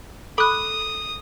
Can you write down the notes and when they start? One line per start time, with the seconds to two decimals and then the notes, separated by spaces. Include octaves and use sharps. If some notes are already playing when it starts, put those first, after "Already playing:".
0.38 A4 B5 D6 D#6 F#6